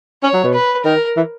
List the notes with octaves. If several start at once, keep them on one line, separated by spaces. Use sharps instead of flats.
C#4 C#5
F#3
B2
B4
D#3 A#4
E3